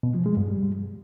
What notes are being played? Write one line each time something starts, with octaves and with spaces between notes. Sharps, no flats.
B2
F3
G#3
G2
G3